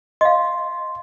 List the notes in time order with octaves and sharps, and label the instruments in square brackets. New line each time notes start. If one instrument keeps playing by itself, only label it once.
[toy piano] D#5 F5 [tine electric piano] C6